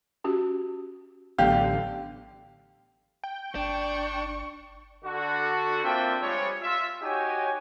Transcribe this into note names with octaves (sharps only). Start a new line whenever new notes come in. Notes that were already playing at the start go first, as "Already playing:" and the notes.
C#4 F#4 G4
A1 D3 F#3 A3 B3 G4 F5
G5
G1 D4 C#6
D3 F#4
A#3 C4 D4 F4 E5 G5
F3 G3 G#3 C#5
F4 E5
D#4 F#4 G4 C#5 G5 G#5